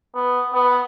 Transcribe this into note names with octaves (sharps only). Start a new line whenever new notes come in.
B3
B3